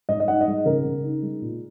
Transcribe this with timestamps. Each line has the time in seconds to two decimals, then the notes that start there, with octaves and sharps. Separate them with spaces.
0.09 G#2 D#5
0.20 D#5
0.28 D#4 F#5
0.41 D#5
0.47 G#3
0.65 C#3 A#4
0.85 C#3
1.04 D#4
1.22 G#3
1.42 A#2